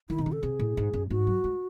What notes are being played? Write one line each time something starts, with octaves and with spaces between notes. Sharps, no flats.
D#3 E4
C3
C#3 D#4
A4
C3 G#4
A2
G#2
F#2
G#2 F#4
F#3
G#3